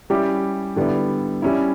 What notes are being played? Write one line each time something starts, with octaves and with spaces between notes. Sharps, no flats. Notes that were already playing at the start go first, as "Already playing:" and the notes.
G3 C#4 E4 G4
D3 G3 B3 E4
G3 C#4 E4